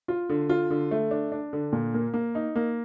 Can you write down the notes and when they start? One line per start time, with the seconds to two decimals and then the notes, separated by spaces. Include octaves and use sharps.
0.08 F4
0.29 D3
0.49 F4
0.70 D3
0.91 A3
1.11 D4
1.32 D4
1.53 D3
1.72 A#2
1.94 A#3
2.14 A#3
2.35 D#4
2.56 A#3